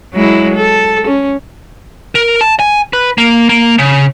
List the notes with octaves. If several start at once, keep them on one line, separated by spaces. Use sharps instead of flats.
F#3 G#3 E4
A4
C#4
A#4
A5
G#5
B4
A#3
A#3
C#3